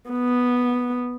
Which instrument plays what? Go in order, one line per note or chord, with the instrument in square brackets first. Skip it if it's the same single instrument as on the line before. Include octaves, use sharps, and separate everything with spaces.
[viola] B3